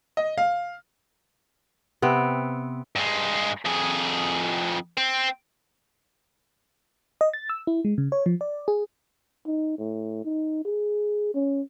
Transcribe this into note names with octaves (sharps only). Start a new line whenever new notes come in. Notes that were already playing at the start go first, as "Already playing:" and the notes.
D#5
F5
C3 B3 C4
G2 G#3
F2 G#4
C4
D#5
A6
E6
E4
G#3
C#3
C#5
F3
D5
G#4
D#4
A2
D#4
G#4
C#4